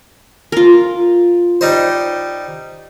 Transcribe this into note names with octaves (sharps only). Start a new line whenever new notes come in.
F4 A#4
G3 D#4 C5